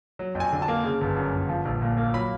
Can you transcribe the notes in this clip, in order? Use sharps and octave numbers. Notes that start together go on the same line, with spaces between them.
F#3
F2
G#5
D3
A5
A#3
C#3
G1
F#2
G1
F3
A#1
A#2
A#3
F#3 B5